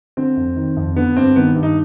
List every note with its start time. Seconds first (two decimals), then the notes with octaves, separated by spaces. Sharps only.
0.17 D3 C4
0.37 F2
0.56 D#3
0.77 F2
0.96 D3 B3
1.16 G2 C4
1.36 D#3 B3
1.55 G2
1.63 D#4